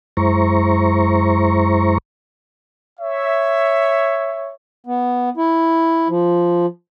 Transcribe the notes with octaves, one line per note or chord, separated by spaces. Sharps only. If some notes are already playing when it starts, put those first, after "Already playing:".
F#2 G#3 E4 C5 A#5 C#6
C#5 E5
B3
E4
F3